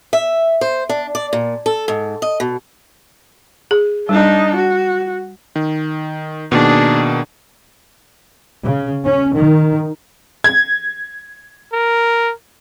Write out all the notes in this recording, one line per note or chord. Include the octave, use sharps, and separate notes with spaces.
E5
C5
D4
D5
A#2
A4
G#2
D#5
B2
G#4
G3 D4 D#4
F#4
D#3
B2 D#3 A#3 D4 G#4
C#3
C#4
D#3
G#6
A#4